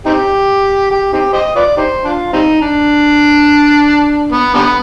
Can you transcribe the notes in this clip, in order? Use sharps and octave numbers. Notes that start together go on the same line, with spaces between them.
C4 D#4 G4
G4
C4 D#4 G4
G4 C5 D#5
F4 B4 D5
D#4 G4 C5
D4 F4
G3 C4 D#4
D4
B3
D3 G3 B3